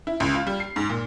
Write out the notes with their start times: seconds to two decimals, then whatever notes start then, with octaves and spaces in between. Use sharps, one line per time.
0.07 E4
0.20 C#2
0.35 F4
0.47 G3
0.60 C7
0.76 G#2
0.89 A#2